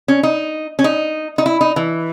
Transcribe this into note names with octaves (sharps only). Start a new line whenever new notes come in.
C#4
D#4
C#4
D#4
D#4
E4
D#4
E3